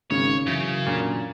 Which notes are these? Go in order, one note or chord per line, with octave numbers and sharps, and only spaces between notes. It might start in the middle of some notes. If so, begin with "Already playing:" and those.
G#1 C#3 C#5
F#2 C#3 E3
A#2 D3